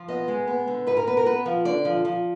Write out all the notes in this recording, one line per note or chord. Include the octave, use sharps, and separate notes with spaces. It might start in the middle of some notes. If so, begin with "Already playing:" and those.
Already playing: F3
B3 D#5
G#3
B3
D3
G#2 B4
A#4
B3 B4
A#4
B3 B4
F3
D3 D5
F3
F3